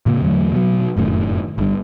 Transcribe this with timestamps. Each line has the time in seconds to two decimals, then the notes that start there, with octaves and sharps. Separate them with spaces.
0.06 A2 C#3 A#3
0.22 E2 D3 F#3 A3
0.52 B2 F#3
0.97 F1 F#2 A2 D#3
1.58 G1 G2